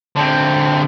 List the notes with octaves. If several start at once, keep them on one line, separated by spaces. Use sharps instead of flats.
D3 C4